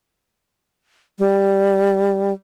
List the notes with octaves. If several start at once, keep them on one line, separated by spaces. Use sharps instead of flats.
G3